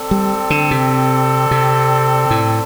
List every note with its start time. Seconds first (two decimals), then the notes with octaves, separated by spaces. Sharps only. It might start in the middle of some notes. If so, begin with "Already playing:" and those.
Already playing: C4 A4 D5 G5
0.11 G3
0.50 D3
0.71 C3
1.51 C3
2.31 A2